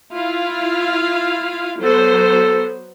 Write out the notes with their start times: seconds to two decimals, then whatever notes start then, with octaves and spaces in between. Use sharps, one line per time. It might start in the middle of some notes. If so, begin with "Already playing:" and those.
0.13 E4 F4 F5
1.81 F#3 B3 A4 C5